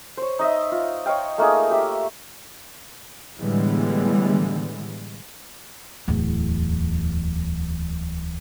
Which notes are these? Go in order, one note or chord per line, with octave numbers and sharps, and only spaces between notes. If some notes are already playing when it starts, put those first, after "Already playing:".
C5 C#5
D#4 D#5 E5
F4
C#5 D#5 F5 G5
A3 A#3 D#4 G#4
G4 E5
A2 D3 E3 G3 G#3 B3
D1 E2